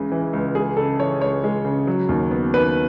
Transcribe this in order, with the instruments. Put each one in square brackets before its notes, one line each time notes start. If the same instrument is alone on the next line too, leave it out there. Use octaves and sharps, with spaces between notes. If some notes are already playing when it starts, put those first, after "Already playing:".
Already playing: [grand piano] C#2 C#3 E3 G#3
E3
C#2
G#3 G#4
C#3 A4
E3 C#5
C#2 C#5
G#3
C#3
F#3
D#2
B3
D#3 B4